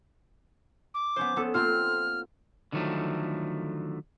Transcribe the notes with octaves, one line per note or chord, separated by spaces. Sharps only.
D6
B3 C#4 C5
B3 A4
A#3 C4 F4 F6
D3 D#3 F3 F#3 A3